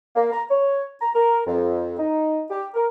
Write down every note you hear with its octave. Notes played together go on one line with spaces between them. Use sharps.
A#3
A#5
C#5
A#5
A#4
F2
D#4
G4
A#4